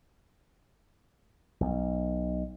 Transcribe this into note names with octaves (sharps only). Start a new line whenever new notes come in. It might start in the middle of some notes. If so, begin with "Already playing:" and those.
B1